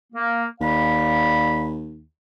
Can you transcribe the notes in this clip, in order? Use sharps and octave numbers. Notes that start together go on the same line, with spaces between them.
A#3
D#2 D5 F5 B5